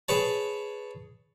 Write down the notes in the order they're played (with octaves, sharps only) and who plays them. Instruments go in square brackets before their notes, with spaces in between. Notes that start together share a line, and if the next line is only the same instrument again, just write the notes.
[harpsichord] G#4 B4 C#5 A5